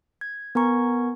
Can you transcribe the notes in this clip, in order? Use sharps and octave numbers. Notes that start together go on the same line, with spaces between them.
G#6
B3 A#4 G#5 A#5 C#6 G#6